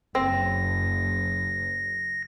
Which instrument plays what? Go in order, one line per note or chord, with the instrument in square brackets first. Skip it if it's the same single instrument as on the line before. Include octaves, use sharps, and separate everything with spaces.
[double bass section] F#1 [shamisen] C4 [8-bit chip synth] A#6